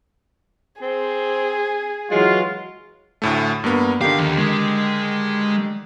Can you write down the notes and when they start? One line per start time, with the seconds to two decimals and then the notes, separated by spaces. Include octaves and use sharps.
0.82 C4 G#4
2.11 E3 F#3 G#3 F4
3.22 D2 A2 A3
3.64 G2 A#3 B3
4.01 D3 D#3 G4 F5
4.19 D#2
4.38 G#3